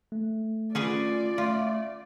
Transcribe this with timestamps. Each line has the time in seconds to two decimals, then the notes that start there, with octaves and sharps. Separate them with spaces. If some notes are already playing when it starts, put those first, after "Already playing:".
0.12 A3
0.75 C#4 F4 G#4 B4 D5
1.38 A3 F4